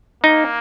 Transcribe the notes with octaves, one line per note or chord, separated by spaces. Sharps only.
A#3 D#4